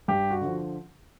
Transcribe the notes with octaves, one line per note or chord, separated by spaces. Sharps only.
G2 G4
F#4
D3 F3